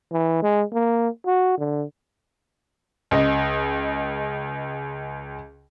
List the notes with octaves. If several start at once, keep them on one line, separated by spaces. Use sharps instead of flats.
E3
G#3
A#3
F#4
D3
C#2 D#5